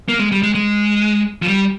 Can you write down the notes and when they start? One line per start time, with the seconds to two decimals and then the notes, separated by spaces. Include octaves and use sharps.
0.09 A#3
0.19 G#3
0.32 G3
0.43 G#3
0.55 G#3
1.42 F3
1.47 G3